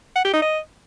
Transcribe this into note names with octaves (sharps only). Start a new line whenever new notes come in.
F#5
G4
D#4
D#5